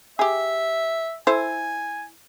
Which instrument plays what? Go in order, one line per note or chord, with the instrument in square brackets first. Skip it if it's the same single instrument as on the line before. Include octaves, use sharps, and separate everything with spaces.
[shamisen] G4 G#4 [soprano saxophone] E5
[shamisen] E4 A4 C5 [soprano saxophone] G#5